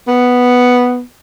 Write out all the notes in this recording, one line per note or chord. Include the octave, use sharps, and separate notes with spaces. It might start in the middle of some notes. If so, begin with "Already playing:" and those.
B3